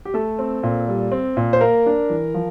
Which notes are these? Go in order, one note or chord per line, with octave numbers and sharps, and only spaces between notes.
G4
A3 A4
C4
A#2
G3
C4
A#2
C5
A#3 A#4
D4
E3
F3